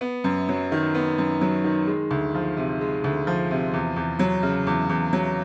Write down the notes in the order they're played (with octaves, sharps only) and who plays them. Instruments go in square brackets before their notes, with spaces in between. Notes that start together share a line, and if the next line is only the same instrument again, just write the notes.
[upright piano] B3
F#2
F#3
D#3
B3
F#2
F#3
D#3
G#3
D2
F3
C3
G#3
D2
F3
C3
E2
E2
F#3
C#3
E2
E2
F#3